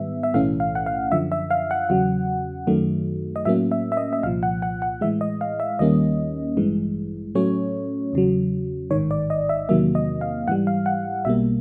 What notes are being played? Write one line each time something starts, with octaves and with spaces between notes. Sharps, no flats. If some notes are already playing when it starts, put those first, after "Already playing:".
Already playing: G#2 D#3 G3 B3 E5
E5
B1 A2 E3 A3 C#4 F5
F5
F#5
F5
F#2 D3 F3 E5
E5
F5
F#5
E2 C#3 F#3
F#2 D#3 F#3 A3
D#5
A2 F#3 A#3 C#4 E5
E5
E5
D#5
E5
C2 A#2 F3 F5
F#5
F#5
F#5
A2 E3 G#3 E5
D#5
F5
E5
D#2 D#3 G3 A#3 C#4 D#5
A1 G2 E3 G#3
A2 F#3 A3 C#4 C#5
E2 C#3 F#3
A1 G#2 D#3 C#5
D5
D#5
E5
E2 C3 D#3 F#3 A#3 E5
D#5
F5
G#2 E3 G3 F#5
F5
F#5
B1 B2 G3 A#3 E5